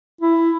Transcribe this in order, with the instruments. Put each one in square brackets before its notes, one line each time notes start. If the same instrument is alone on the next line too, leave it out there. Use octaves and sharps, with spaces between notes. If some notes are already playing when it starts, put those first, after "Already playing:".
[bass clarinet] E4